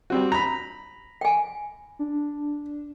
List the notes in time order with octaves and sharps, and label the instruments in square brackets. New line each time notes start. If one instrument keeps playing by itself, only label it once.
[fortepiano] G3 C4 F#4
A#5 B5
[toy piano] G5 G#5
[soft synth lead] D4